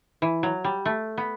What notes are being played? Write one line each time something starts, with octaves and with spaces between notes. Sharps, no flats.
E3
F#3
G3
A3
B3